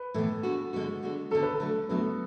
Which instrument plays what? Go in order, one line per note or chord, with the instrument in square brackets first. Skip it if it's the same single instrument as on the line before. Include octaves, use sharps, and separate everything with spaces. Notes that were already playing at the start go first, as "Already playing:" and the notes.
Already playing: [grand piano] B4
[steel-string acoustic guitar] A2 E3 B3 [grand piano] A4
[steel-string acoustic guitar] D3 G#3 B3 F#4
D3 G#3 B3 F#4
D3 G#3 B3 F#4
[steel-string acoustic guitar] D3 G#3 B3 F#4 [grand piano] A4
[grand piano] B4
A4
[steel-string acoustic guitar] D3 F#3 A3
[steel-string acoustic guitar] D3 F#3 A3 [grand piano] B3